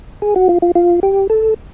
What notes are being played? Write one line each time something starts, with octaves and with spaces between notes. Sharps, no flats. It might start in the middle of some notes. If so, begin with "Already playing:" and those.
G#4
F#4
F4
F4
F4
G4
A4